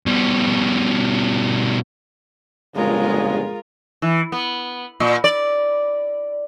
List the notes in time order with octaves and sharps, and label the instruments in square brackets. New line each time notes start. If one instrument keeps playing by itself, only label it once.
[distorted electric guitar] B2 G3
[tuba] G1 [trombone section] F2 A#2 C#3 [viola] G#3 G#4 [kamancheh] F4 A#4
[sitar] E3
B3
A#2
D5